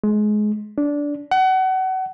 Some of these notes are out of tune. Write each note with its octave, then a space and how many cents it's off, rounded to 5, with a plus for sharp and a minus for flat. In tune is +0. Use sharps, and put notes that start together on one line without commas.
G#3 +25
D4 -15
F#5 +30